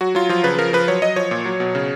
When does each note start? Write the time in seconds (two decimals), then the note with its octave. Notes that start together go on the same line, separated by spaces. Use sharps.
0.01 F#3 F#4
0.15 F#3 F4
0.29 F3 F4
0.44 C#3 B4
0.58 F3 A#4
0.73 F3 B4
0.88 F#3 C#5
1.02 F#3 D#5
1.16 F3 C#5
1.31 A#2
1.45 F#3
1.60 B2
1.75 C#3